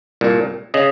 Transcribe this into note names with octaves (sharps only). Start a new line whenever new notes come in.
C2 A#2
C#3 D#5